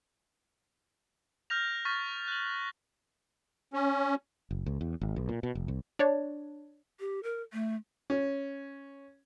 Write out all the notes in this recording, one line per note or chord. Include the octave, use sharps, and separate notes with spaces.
F6 G6 A#6 F7
C#6 F6 G6 A6 B6
F#6 F#7
C#4
F#1
C#2
E2
G#1
B1
A#2
B2
F1
C2
D4 C#5 D5
G4
A#4
A3
C#4